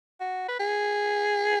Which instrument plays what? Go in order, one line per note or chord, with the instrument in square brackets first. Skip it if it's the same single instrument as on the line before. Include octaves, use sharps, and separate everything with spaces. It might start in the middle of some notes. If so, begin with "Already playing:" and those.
[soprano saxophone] F#4
B4
G#4